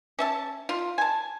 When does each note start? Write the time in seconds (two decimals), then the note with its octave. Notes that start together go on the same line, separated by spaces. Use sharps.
0.19 C#4 E5 A5
0.69 F4
0.98 G#5 A5